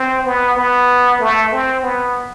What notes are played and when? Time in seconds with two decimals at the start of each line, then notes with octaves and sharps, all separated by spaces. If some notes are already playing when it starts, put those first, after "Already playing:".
Already playing: C4
0.25 B3
0.57 B3
1.20 A3
1.52 C4
1.83 B3